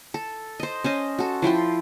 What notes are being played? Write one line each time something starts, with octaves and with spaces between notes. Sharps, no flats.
A4
C5 D#5
C#4 C5 D#5 C6
F#4 A4
F3 E4 G5 C6